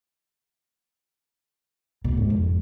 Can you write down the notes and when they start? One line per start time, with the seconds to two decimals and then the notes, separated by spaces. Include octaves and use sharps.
2.04 B2
2.17 G#2
2.30 F2